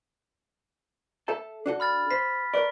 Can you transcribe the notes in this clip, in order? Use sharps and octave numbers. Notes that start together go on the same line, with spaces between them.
A4 E5 A5
D4 F#4 A4
B5 F6 A6
C5 B6
A#4 B4 D5 C#6